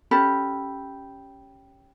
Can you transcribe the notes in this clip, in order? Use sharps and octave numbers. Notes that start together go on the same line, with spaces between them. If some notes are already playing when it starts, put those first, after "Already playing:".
C#4 G4 A4 B5